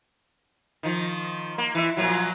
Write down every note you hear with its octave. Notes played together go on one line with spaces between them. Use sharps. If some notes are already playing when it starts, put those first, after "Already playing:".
D#3 F3
A#3
E3 E5
A#2 F3 F#3